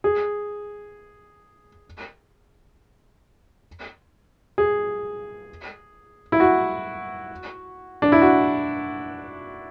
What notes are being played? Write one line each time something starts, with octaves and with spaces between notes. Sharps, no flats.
G#4
G#4
E4
F#4
D4
E4
F#4